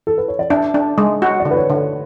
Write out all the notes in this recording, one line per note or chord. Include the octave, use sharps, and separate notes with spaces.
A4
B4
C#5
D5
D4 E5
D4
G#3
F#4
D5
D3
B4
C#5
D3